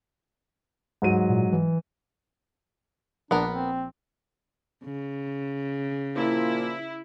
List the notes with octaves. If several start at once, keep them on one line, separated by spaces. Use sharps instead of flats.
G#2 F#3 D#7
A#2
E3
A#1 B3 D4 A#4
C4
C#3
A#2 F3 A#3 E4